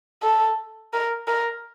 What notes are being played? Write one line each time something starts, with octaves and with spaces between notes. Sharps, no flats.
A4
A#4
A#4